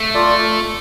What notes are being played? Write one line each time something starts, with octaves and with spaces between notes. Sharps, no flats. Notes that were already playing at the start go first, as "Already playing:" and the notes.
Already playing: A3
F4 A4 D5